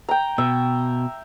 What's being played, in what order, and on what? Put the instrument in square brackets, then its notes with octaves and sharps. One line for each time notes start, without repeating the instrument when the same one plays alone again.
[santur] G5 A#5
[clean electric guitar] B2 [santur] E5